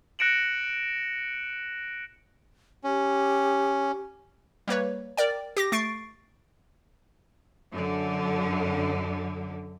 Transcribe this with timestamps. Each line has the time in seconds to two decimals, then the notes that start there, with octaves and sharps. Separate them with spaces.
0.19 F#6 A#6 C#7 D7 E7 F#7
2.84 C#4 G4
4.68 G3 A#3 B4 C#5
5.17 A#4 D5 G5
5.57 G4 D6 A#6
5.72 A3 C#6 A6 C7 D7
7.71 F#2 D3